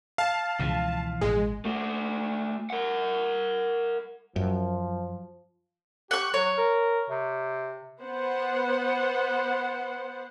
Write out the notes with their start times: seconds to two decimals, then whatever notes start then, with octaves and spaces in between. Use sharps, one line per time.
0.18 F5 A5
0.60 C#2 B2 E3 F3
1.21 A1 G#3
1.65 A3 F#4
2.70 A#4 F#5
4.36 F#2 F3
6.11 G4 F#5 C#6
6.34 F#3 C#5
6.58 A#4
7.10 C3
8.01 B3 C5 F#5